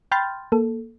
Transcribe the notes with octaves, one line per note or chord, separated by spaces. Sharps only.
G5 B5 C6 F6 G6 A6
A#3 A4